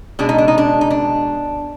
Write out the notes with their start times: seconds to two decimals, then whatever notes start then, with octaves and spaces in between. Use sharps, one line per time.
0.19 B2 G#3 D4
0.29 D#4
0.38 D4
0.48 D#4
0.58 D4
0.81 D#4
0.90 D4